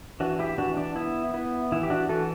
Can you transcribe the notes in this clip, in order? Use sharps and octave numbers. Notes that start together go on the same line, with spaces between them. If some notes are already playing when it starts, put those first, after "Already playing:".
E3 D4 F#4
E4 G4
E3 D4 F#4
D4
B3 E4
B3 E4
E3 E4
G4
D4 F#4
E3 F#4 A4